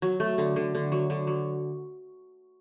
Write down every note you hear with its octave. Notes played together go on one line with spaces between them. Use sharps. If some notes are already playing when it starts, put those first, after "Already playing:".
F#3
A3
D3
D3
D3
F#3
D3
F#3